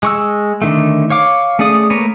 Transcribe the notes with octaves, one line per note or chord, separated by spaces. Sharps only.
G#3 C#6 E6
D3 D#3 A3
C#5 F5 D6
A3 C#4 G#4 D5 D#6
A3 A#3 A#4 B4 C#5